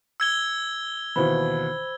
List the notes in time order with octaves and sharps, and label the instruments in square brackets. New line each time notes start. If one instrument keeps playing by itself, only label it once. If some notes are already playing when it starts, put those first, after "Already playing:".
[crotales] E6 G#6 G7
[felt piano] D#2 B2 E3 [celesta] C5 B5